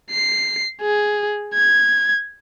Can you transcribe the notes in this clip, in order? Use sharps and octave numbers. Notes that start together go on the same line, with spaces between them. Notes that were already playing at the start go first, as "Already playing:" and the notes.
C7
G#4
G#6